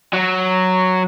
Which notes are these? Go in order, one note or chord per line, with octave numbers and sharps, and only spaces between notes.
F#3